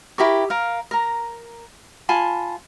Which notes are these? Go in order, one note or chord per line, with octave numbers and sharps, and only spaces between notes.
E4 G4 A#4 C#6
A#4 F5
A#4 A#5
F4 G#5 A5 B5